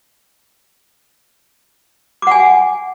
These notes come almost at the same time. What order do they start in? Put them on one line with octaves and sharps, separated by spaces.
D6 F#5 G#5